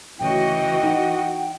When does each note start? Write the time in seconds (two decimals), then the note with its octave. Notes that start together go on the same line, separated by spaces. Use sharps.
0.19 D2 C#3 E3 F#4 D#5 G5
0.83 D#4 F#5